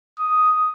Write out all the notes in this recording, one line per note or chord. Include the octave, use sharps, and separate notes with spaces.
D#6